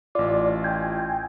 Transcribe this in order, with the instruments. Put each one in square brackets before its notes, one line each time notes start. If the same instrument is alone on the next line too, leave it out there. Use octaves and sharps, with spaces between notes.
[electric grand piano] A1 F4 [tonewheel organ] D5
[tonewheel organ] G5 G#5